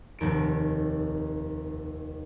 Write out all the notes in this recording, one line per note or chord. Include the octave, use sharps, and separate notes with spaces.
F1 D#2 D7